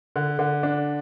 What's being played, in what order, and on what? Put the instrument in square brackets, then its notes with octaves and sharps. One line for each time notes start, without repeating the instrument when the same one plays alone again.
[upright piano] D3
D3
D4